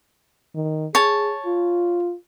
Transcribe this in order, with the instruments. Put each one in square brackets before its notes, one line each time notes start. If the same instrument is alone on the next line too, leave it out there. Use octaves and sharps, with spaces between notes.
[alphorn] D#3
[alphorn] G#4 [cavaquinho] C#5 A5
[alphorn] F4